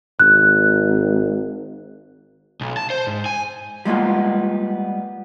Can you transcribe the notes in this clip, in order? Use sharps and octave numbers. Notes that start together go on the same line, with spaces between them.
G#1 F#6
B1
A5
C5
G#2
G#5
G3 G#3 A#3 B3 F4